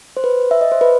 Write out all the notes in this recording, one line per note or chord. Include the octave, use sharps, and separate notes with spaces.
C5
B4
E5
D#5
C5
B4